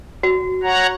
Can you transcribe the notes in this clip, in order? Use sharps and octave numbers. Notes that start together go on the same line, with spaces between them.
F#4
C#5 F#5 A#5